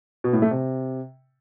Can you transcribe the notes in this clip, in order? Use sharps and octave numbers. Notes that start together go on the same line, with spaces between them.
B2
A2
A3
C3